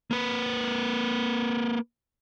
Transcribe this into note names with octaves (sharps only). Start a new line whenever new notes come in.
A#3 B4